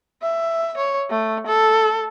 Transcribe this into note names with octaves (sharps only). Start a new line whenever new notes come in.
E5
C#5
A3
A4